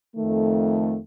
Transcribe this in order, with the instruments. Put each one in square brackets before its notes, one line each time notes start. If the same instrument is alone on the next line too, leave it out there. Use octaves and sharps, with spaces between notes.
[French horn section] F2 D#3 A3